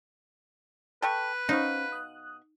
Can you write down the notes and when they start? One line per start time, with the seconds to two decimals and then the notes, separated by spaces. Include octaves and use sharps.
1.02 A4 B4 G5 C#6
1.49 B2 C#4 D#4 C5 F5 C#6
1.92 D#6 F#6